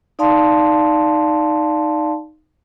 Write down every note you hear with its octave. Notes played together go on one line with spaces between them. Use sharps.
D#4 D5 F5 A5 C6